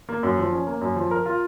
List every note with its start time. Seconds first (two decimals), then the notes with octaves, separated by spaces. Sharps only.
0.09 A#3
0.23 F#2
0.38 F3
0.53 C#4
0.67 A#3
0.81 F#2
0.96 F3
1.11 A#4
1.26 F4